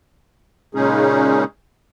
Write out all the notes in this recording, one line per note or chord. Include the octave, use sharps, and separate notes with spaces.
A#2 C#3 G#3 C#4 D#4 G#4